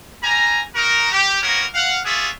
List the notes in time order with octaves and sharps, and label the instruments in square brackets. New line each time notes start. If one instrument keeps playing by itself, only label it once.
[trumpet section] G3 G#5 A#5
D#4 F#4 A#4
G4
A#3 B3 C#4 F#4 A#4
F5 F#5
F4 F#4 G#4 D5 E5